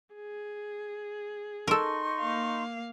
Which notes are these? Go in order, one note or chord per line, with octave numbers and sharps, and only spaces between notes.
G#4
D#4 A4 A#4 C6 C#6
A#3 F5